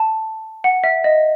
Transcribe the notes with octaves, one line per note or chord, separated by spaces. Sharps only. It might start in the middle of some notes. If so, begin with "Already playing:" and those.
Already playing: A5
F#5
E5
D#5